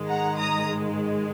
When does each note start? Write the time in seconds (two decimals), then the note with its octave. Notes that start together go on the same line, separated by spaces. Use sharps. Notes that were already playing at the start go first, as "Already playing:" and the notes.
Already playing: G#2 D#3 G#3
0.09 F#5 A#5
0.37 A#5 D#6